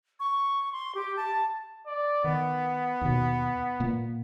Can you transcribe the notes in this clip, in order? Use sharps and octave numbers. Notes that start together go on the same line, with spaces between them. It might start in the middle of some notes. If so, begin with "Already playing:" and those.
C#6
C6
G4
A5
D5
D#3 B3
D#2 B2
A#2 A#3